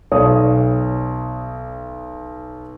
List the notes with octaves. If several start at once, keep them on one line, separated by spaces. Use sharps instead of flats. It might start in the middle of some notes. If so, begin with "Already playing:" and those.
B1 C#5 F5 D#6